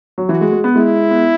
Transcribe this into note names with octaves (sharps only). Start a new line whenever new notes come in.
F#3
E3 F#4
G#3
G#3
B3
G#3 E4
B3